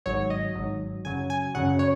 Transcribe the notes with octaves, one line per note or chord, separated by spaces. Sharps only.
G#1 G#2 F#3 C#5
D#5
G#1 G#2 F#3
F#2 C#3 F#3 G#5
G#5
F#2 C#3 F#3 F#5
C#5